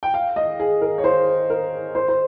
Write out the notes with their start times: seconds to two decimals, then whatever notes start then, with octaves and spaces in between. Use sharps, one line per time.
0.03 G5
0.14 F5
0.36 D#5
0.60 G#4
0.81 A#4
0.98 C#5
1.04 C5
1.50 A#4
1.95 C5
2.08 C5